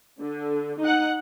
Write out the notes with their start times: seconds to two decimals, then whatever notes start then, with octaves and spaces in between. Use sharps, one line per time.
0.21 D3
0.80 D#4 F#5